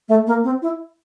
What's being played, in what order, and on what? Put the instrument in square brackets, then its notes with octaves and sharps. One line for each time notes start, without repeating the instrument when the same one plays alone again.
[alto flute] A3
A#3
C4
E4